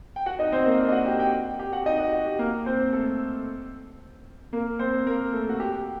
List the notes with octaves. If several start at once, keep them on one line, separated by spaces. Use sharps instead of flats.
G5
F#4 F#5
D#4 D#5
C4 C5
A#3 A#4
D4 D5
D#5
F#4 F#5
G4 G5
G4 G5
G4 G5
F#4 F#5
D#4 D#5
F#4
F#4
G4
A#3 A#4
C4 C5
A3 A4
A#3 A#4
C4 C5
A#3 A#4
A3 A4
F#4
G4